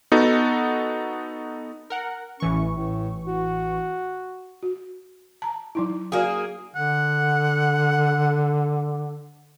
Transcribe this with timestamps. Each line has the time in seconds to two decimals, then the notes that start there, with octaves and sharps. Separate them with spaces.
0.12 B3 D#4 F#4 A4
1.90 A#4 F#5
2.40 A1 E3 C#4 C#6
2.75 A2
3.27 F#4
4.63 F#4
5.42 A5 A#5
5.75 F#3 D#4 E4
6.12 A#3 C#4 F#4 G#4 D5
6.76 D3 F#5